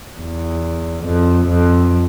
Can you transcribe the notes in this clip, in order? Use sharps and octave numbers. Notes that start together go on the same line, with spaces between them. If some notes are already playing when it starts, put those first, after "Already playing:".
E2
F2
F2